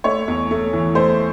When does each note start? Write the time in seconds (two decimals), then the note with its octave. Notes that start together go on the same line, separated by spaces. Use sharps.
0.04 A3 C#5
0.28 E2
0.51 A3
0.73 E3
0.95 A3 C5